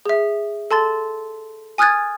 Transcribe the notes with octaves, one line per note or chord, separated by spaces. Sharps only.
G#4 E5
A4 A5 C6 A6
G#5 D#6 F6 F#6 G#6 A6